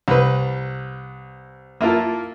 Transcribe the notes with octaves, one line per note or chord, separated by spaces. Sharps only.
C2 B4
A#3 E4 F4 A#4 A5